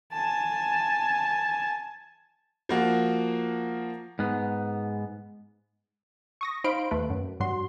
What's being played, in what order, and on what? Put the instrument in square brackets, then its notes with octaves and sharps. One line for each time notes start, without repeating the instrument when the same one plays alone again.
[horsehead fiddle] G#5 A5
[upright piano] F3 A#3 F#4
[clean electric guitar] G#2 B3
[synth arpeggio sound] C#6 D#6 A#6
D#4 C5 F5 B5 C6 D7
D#2 A3 B4
F#2
G2 F#3 F#4 C6